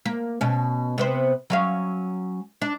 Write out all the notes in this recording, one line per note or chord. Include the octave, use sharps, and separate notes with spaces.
A#3
B2 C#4
C3 B3 C5
F#3 C#4 F5
D4